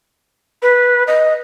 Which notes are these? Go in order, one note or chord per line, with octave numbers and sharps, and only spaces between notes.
B4
D#5